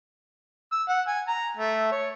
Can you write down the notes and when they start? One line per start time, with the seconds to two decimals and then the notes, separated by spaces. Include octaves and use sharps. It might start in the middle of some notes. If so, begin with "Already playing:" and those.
0.72 E6
0.89 F#5
1.07 G#5
1.28 A#5
1.57 A3
1.92 C#5